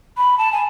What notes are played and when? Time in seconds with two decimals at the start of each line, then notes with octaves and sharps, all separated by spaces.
0.17 B5
0.38 A5
0.52 G#5